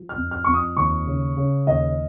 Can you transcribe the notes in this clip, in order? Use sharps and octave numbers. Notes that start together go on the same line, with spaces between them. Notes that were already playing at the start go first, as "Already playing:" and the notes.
Already playing: F3
F6
F2
F6
F2 C#6
D#6
D#2 C#6
C#3
C#3
D#2 D#5